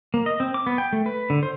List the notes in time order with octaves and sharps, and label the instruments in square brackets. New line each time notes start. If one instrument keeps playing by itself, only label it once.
[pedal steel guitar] A#3
D#5
C4
D6
B3
G5
A3
B4
D3
C5